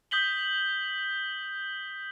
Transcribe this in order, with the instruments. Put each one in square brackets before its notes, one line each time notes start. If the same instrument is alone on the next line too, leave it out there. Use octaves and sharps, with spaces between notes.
[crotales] D#6 G6 B6 F#7 G7